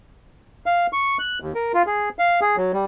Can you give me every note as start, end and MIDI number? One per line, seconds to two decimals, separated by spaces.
0.66 0.87 77
0.93 1.17 85
1.19 1.39 90
1.41 1.53 39
1.55 1.72 70
1.74 1.83 65
1.87 2.09 68
2.19 2.40 77
2.41 2.56 68
2.57 2.72 54
2.73 2.85 55